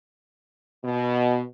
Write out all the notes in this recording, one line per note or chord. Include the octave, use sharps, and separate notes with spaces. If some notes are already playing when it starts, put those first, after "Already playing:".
B2